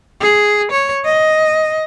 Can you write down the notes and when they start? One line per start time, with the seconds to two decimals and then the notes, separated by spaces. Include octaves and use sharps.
0.21 G#4
0.71 C#5
1.05 D#5